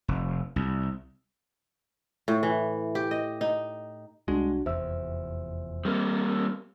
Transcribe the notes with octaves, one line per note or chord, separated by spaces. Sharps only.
F1
C2
A2
E3
G4
D#5
D#4
C2 G#3 D4 F#4
F1 E2 C5 E5 E6
G3 A#3 C4